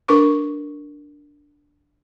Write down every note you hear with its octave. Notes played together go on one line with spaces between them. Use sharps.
D4 A#4 B4 C#6 D6